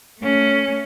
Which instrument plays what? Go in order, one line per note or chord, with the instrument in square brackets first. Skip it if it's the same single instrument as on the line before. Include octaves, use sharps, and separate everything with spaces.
[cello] A3 C#4